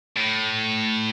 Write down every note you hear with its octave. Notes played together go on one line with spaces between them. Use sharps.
A2